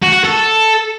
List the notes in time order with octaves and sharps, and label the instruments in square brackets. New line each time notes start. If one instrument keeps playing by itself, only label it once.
[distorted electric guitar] F#4
F#4
A4